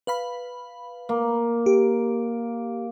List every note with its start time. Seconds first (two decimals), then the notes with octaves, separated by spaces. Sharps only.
0.07 B4 F5 B5
1.09 A#3
1.66 G4